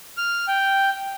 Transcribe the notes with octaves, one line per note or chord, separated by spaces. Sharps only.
F6
G5